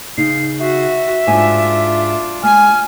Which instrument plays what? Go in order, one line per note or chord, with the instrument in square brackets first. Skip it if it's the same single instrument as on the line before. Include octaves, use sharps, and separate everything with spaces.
[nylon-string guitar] C#3 D#4 [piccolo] C7
[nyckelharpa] F#4 [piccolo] E5
[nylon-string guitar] G#2 G#5 [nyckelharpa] D4 F4
[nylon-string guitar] G#3 [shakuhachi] G#5 [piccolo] F6